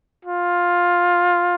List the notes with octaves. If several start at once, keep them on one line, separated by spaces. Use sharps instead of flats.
F4